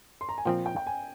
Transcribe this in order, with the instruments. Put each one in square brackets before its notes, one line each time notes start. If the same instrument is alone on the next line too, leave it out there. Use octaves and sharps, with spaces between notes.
[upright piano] C6
A#5
G#5
[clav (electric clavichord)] A#2 F3 C4 [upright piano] G5
[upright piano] G5
G5
G#5